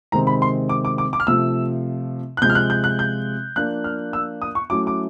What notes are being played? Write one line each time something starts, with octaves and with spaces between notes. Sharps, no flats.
C3 D#3 G#3 C4 A#5
B5
C6
D6
D6
D6
D6
F6
C3 F3 A3 E6
F#6
C3 F3 G#3 G6
F6
F#6
G6
F#6
G6
F3 A#3 D4 F4 F#6
F6
E6
D#6
C#6
F#3 A3 C#4 E4 D6
D6